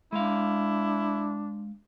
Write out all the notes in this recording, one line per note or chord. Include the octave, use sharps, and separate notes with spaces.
G#3 D4 E4 F5